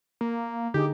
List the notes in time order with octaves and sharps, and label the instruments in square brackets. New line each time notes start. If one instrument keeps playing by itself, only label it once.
[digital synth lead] A#3
[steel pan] D3 D#4 G#4 [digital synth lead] G4